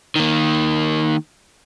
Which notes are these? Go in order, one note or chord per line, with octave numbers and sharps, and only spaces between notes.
D#3 A#3